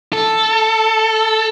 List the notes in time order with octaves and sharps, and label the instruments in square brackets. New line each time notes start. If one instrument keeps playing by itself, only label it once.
[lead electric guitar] A4